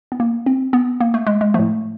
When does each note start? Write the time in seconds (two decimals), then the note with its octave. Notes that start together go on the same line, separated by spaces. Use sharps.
0.12 B3
0.20 A#3
0.46 C4
0.73 B3
1.00 A#3
1.14 A3
1.27 G#3
1.41 G#3
1.54 A2 F3 A3